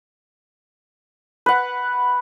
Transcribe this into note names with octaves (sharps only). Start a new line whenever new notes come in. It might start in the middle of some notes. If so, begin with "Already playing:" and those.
B4 F#5